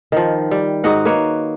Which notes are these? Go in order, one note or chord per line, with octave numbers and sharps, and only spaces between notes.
D#3 F3
G3
G#2 D#4 F#4 F#5
A#3 B4 C#5